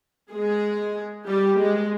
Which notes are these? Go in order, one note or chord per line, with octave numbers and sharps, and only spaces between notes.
G#3 G#4
G3 G4
G#3